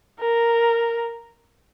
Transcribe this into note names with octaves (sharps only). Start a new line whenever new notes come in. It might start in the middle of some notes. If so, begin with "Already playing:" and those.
A#4